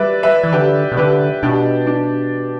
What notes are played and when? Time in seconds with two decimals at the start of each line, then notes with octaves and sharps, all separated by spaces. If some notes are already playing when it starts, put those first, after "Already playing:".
Already playing: G3 B4 D5 E5
0.23 B4 E5
0.44 E3
0.52 D3 G4 B4
0.92 B2
0.97 D3 G4 B4
1.43 B2 D4 G4
1.86 D4